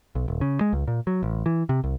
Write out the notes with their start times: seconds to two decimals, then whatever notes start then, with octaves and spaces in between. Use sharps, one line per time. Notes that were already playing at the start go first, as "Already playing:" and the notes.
0.15 B1
0.28 D#1
0.41 C#3
0.61 G#3
0.73 C#2
0.88 A#2
1.07 F#3
1.23 A1
1.46 E3
1.69 C3
1.84 C2